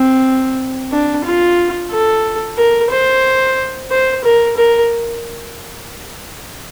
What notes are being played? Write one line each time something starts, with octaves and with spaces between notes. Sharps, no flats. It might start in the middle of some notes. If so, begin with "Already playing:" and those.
Already playing: C4
D4
F4
A4
A#4
C5
C5
A#4
A#4